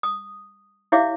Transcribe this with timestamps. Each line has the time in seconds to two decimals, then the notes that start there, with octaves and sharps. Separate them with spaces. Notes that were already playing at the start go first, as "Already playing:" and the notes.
0.03 D#6
0.92 E4 G4 C#5 E5 F5 D6